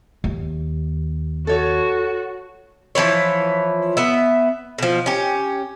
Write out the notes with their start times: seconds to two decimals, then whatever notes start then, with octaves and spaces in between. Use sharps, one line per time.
0.24 D#2
1.47 F#4 A4 C#5
2.95 E3 F3 B4 C#5
3.97 B3 E5
4.78 B2 F3
5.06 C#4 G4